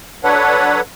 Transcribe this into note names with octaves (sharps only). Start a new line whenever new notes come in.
F#3 D4 A4 B4 C#5 F#5